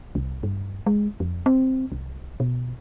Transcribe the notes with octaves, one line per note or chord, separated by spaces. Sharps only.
C2
G2
G#3
F2
C4
C2
B2